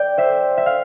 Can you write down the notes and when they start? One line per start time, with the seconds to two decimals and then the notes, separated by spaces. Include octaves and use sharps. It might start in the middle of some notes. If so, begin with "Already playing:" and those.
Already playing: D5 G5
0.18 C5 E5
0.57 E5
0.66 F5